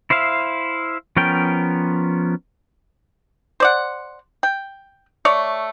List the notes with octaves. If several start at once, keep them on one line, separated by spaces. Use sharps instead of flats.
E4 C5 E5 F5
F3 B3 C#4 A#4 G5
C5 D5 F#5
G5
A3 C#5 D5